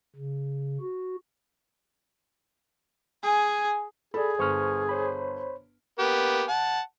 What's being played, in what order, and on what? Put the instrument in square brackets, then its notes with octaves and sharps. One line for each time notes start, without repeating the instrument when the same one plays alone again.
[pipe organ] C#3
F#4
[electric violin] G#4 [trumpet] G#5
[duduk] G#4 [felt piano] A4 D5 [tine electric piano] B5
[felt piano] G1 [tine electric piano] C5 C#6 F6
[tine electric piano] C5 C#5 B5
[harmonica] A#3 B3 G4
F#5 A5